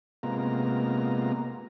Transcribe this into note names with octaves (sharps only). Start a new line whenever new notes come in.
C3 G#3 A#3 B3 F4 A#5